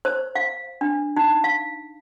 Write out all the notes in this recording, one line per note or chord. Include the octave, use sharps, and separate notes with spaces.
C5
F5
D4
D#4
F5